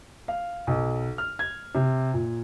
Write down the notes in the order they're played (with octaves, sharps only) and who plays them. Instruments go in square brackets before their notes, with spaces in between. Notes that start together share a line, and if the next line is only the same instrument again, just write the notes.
[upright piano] F5
B1
F6
G#6
C3
A#2